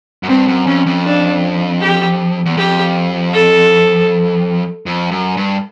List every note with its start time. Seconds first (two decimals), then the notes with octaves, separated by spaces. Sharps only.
0.23 F#2
0.28 G2 C4
0.48 F#2
0.67 F2 C#4
0.86 F2
1.05 D4
1.81 G4
2.46 E2
2.57 F2 G4
3.33 A4
4.86 F2
5.11 F#2
5.37 G2